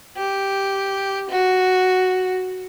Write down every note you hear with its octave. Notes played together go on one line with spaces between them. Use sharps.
G4
F#4